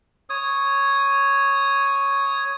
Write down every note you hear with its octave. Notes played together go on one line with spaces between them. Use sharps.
C#5 D#6